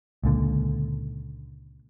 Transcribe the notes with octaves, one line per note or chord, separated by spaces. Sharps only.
C#2 A#2 D3